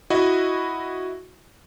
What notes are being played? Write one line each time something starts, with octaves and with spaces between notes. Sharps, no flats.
E4 F#4 D#5